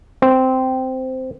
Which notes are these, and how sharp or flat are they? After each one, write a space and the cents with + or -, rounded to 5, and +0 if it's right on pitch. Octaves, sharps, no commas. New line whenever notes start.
C4 -10